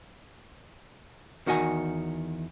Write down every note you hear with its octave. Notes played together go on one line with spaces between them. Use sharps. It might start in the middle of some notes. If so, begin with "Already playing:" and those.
E2 D#3 F#4 D#5 G#5